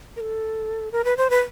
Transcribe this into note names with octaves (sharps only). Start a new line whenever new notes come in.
A#4
A4
A#4
B4
C5
B4